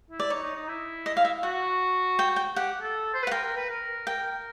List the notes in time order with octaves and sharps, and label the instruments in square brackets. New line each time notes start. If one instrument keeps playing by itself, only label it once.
[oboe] E4
[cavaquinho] D5
[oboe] D#4 [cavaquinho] C#5
[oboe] D#4
D#4
E4
[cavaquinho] D#5
F5
E5
[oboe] F#4 [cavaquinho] F#5
[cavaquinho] G5
G5
[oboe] G4 [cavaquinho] F#5
[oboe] A4
C5
B4
[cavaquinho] F#5
[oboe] A#4 [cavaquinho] G5
[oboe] A#4
B4
A#4
[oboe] A#4 [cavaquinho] G5